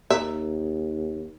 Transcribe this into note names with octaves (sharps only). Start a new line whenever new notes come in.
D#2 A#4 E5 A#5